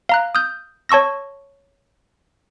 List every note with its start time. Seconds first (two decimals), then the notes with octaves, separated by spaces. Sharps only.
0.09 F5 A#5 F#6
0.35 D#6 F6 G6
0.89 C#5 A5 C#6 E6 A#6